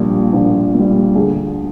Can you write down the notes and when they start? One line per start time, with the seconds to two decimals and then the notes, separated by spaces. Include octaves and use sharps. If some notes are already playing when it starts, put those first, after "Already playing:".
Already playing: A#1 A#2 G3
0.33 A#1
0.74 A#2 G3
1.15 D2 G#4